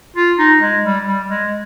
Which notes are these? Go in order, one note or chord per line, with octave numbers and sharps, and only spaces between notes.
F4
D#4
G#3
G3
G3
G#3